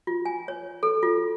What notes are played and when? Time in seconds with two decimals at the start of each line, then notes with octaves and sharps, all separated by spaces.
0.07 F4
0.25 G#5
0.48 C#5
0.83 A4
1.03 F4